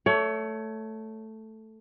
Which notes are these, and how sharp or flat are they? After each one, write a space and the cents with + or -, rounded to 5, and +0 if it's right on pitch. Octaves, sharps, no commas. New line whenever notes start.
A3 +0 C#5 +25